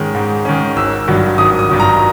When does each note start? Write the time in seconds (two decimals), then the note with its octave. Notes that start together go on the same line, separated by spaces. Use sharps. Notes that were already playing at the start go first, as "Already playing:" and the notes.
Already playing: G#2 D#3 G#3 C#4
0.15 G#2
0.45 D#3 G#3 C#4
0.76 G#1 E6
1.08 G2 D#3 F#3
1.38 G#1 D#6
1.59 D#6
1.69 G2 D#3 F#3
1.80 A#5